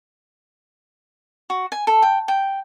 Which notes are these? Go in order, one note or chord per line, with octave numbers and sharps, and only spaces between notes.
F#4
G#5
A4
G5
G5